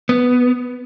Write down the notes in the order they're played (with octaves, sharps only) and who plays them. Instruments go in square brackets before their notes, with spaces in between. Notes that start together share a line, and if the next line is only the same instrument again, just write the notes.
[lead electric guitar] B3